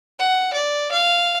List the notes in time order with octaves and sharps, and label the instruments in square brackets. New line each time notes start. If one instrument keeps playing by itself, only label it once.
[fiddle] F#5
D5
F5